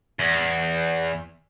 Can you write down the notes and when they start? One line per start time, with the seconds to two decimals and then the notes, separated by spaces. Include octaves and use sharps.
0.19 E2